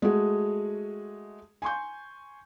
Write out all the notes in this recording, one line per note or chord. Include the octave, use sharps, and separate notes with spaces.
G#3 A3 F#4 G#4
G#5 C6 C#6 G6